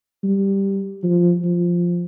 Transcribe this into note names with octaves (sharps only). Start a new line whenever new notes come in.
G3
F3
F3